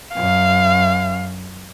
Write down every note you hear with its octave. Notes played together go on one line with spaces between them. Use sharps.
F#2 F5